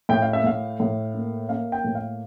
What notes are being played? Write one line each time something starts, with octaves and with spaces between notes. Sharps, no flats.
A2 G5
F5
E5
A2 F5
A2
A#3
A#3 F5
G5
A2
F5